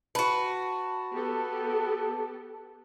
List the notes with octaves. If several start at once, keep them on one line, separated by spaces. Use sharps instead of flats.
F#4 B4 A5
B3 G4 A4